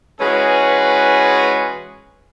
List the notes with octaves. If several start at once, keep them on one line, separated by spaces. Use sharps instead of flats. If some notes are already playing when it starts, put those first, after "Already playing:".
E3 G#3 C#4 F#4 G#4 B4